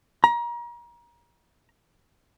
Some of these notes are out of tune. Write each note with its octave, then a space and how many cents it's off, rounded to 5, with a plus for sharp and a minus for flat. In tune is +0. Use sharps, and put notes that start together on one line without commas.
A#5 +30